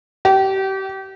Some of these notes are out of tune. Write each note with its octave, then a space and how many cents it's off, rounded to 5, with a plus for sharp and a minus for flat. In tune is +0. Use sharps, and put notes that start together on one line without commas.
G4 -30